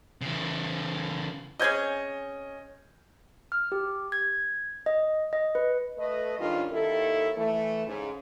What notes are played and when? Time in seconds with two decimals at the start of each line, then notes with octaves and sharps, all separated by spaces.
0.21 C#3 E3
1.59 C3 C#4 G#4 D#5 G6 G#6
3.52 F6
3.72 G4
4.12 G#6
4.86 D#5
5.33 D#5
5.55 B4
5.98 A3 A4 B4 D#5
6.40 G#2 D#3 G3 C#4 D4 F4
6.72 D#2 D#3 E4 A4
7.37 E3 A3
7.87 G#2 C#3